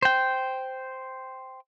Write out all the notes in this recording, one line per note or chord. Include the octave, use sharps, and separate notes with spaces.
C5 G5